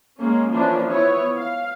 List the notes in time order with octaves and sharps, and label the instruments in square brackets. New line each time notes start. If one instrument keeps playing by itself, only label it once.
[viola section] G#3 A#3 C#4
E3 F3 A#3 C#4 D4
B3 E4 C#5
F5